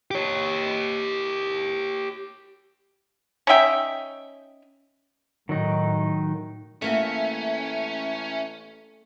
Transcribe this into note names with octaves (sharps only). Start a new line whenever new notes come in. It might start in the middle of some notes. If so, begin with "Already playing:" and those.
G4 C#5
C#4 D#4 E5 G5
A2 D#3 F#3 D#4
A1 A3 A#3 C#4 F#4 E5